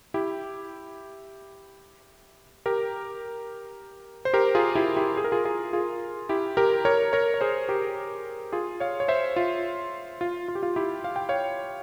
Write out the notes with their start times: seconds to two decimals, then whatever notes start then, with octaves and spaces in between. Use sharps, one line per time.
0.14 E4 G4
2.66 G4 A#4
4.25 C5
4.33 G4 A#4
4.55 F4 G#4
4.75 E4 G4
4.96 E4 G4
5.17 G#4
5.24 A#4
5.32 F4 G#4
5.45 F4 G#4
5.73 F4 G#4
6.29 E4 G4
6.57 G4 A#4
6.85 A#4 C#5
7.13 A#4 C#5
7.34 C#5
7.41 G#4 C5
7.69 G4 A#4
8.52 F4 G#4
8.80 C#5 F5
9.00 C#5
9.08 C5 E5
9.36 F4
10.21 F4
10.48 F4
10.55 G4
10.63 F4
10.76 E4 G4
11.04 F5
11.16 G5
11.29 C#5 F5